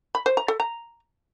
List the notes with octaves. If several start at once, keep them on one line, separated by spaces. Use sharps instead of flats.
B5
C5
A#5
A4
A#5